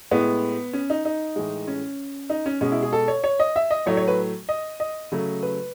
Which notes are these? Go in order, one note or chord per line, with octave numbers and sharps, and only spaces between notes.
A2 G#3 B3
C#4
D#4
D#4
A2 E3 G#3
C#4
D#4
C#4
B2 G#3 C#4
E4
G#4
A4
C#5
C#5
D#5
E5
D#5
A2 F#3 A3 C#5
C#5
B4
D#5
D#5
C#3 F#3 A3
B4